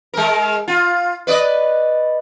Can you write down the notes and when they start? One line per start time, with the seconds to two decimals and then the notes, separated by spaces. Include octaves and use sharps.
0.14 G#3 A#4
0.68 F4
1.27 B4 D5 D#5